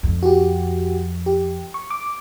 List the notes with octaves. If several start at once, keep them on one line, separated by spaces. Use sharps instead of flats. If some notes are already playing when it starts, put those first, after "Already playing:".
F2
F#4 G4
G4
C#6
D6